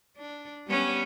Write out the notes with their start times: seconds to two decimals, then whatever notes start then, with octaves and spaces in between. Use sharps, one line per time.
0.17 D4
0.67 G3 B3 C#4